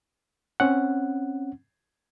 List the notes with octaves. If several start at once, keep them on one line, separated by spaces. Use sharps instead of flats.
C4 C#4 F#5